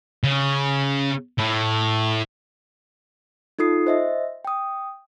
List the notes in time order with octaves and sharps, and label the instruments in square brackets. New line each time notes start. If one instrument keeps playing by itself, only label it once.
[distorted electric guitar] C#3
A2
[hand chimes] D#4 F4 A4 D#6 C7
C5 D#5 E5
G5 D#6